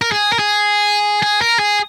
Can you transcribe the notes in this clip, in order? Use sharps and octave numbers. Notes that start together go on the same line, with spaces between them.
A#4
G#4
A#4
G#4
G#4
A#4
G#4